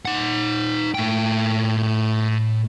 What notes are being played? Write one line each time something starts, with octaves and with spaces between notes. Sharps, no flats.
D#4 F#5
A2 G5